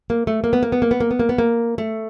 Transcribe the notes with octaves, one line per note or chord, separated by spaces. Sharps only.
A#3
A3
A#3
B3
A#3
B3
A#3
B3
A#3
B3
A#3
B3
A#3
A3